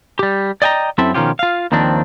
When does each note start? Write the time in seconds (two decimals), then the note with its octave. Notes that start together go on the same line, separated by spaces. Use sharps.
0.19 G3 G4
0.62 D5 D#5 G5 G#5 A#5
0.98 F#2 C4 E4 A4 E5
1.14 B2 D#3 F3 C#4 F4 G4
1.39 F4 F5
1.72 D#2 D#3 F3 C4 D4